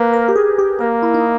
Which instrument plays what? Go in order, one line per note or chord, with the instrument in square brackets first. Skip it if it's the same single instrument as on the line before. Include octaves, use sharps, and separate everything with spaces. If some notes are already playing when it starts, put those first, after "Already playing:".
Already playing: [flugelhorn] A#3 [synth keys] B4
[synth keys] A#4
G4
G#4
G4
[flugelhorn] A#3 [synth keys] A#4
[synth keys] E4
D#4